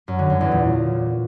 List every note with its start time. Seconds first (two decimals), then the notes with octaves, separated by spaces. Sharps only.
0.08 F#2
0.19 D3
0.30 F#2
0.41 E2
0.52 A#2